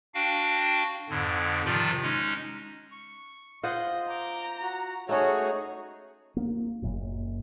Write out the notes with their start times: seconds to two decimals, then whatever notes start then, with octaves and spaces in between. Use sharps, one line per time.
0.14 D4 F#4 F5 G5
1.09 F2 G#2 D3
1.65 C3 D#3 F3 F4 D5
2.02 G#3 C#4 D#4
2.91 C#6
3.63 F4 C5 D#5 F#5 C6 D#6
4.10 A#5 D6 G6
4.62 F#4
5.09 A3 C#4 D#4 F#4 G#4 C#5
6.37 A#3
6.82 F#1 F#2 A#2